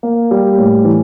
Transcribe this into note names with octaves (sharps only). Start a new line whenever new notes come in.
A#3
G3
A2
E3